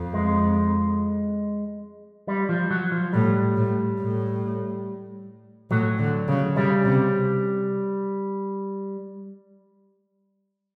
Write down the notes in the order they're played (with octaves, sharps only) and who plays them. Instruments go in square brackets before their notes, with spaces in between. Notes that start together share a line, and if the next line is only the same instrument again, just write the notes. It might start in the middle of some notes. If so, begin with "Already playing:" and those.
Already playing: [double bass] F2
[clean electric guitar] G#3
G3
F3
F#3
F3
[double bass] A2 [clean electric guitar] G3
[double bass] A2
A2
[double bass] A2 [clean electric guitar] F#3
[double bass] D3
C#3
[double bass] C#3 [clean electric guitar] G3
[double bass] C3